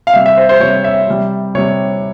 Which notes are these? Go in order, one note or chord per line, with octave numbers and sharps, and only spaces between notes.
F5
C3 G3 E5
E5
C5
C5
C3 G3 C#5
E5
C3 G3
C3 G3 C#5